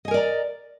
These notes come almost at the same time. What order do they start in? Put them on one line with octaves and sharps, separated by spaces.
D#5 G#5 A#4 D5 A#5